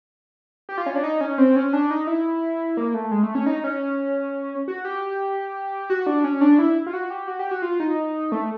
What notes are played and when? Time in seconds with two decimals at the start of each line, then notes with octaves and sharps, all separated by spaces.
0.69 G4
0.78 F4
0.86 C#4
0.95 D4
1.04 D#4
1.21 C#4
1.38 C4
1.56 C#4
1.73 D4
1.90 D#4
2.07 E4
2.77 A#3
2.94 A3
3.11 G#3
3.23 A3
3.35 C#4
3.46 D#4
3.64 C#4
4.68 F#4
4.85 G4
5.90 F#4
6.07 D4
6.24 C#4
6.41 D4
6.59 E4
6.86 F4
6.93 F#4
7.10 G4
7.28 F#4
7.39 G4
7.51 F#4
7.62 F4
7.80 D#4
8.32 A3